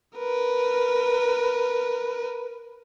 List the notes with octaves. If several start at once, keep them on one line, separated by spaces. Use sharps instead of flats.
A#4 B4